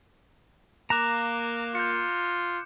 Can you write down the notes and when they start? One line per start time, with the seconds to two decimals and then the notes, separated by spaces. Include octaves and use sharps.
0.90 A#3 A#5 D6 F#6 E7
1.75 F4 G6 C#7